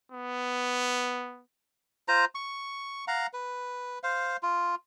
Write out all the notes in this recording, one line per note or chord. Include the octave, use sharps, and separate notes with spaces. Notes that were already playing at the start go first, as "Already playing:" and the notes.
B3
F4 C5 A#5
C#6
F5 F#5 A#5
B4
C5 F5
F4